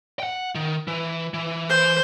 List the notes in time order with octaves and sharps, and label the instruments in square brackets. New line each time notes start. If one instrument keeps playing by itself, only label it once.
[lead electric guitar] F#5 G5
D#3
E3
E3
[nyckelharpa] C5